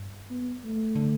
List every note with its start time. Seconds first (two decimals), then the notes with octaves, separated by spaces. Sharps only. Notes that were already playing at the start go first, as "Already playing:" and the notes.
Already playing: G2
0.30 B3
0.64 A3
0.95 D3